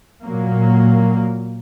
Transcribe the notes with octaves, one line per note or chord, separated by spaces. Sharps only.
A#2 F#3 A#3